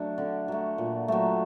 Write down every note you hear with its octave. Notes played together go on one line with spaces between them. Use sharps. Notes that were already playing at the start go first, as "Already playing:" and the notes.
Already playing: F#3 A3 D4
D3
F#3 A3
A#2
F#3 A3